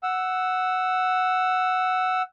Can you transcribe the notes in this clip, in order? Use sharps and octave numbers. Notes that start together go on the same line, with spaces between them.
F#5 E6